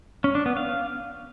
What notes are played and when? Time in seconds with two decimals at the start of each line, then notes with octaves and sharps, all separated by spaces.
0.24 C#4
0.35 D4
0.46 B3
0.57 F5